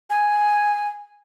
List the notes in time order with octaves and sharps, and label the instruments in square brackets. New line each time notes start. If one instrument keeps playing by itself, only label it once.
[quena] G#5